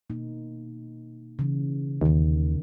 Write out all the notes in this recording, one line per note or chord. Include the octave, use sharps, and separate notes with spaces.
B2 A#3 D#4
C#3 E3
D#2 C3 D#3